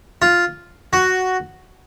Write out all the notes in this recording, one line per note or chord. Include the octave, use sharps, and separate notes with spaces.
F4
F#4